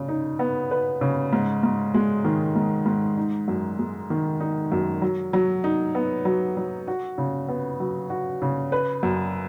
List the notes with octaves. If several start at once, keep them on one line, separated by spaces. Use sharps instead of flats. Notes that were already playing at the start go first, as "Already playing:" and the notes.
Already playing: C#3
D#4
B3
B4
C#3
G#2
G#2
G#3
D#3
G#2
G#2
D#4
F#2
G#3
D#3
D#4
F#2
F#3
F#3
D#4
B3
F#3
F#3
F#4
C#3
B3
F#3
F#4
C#3
B4
F#2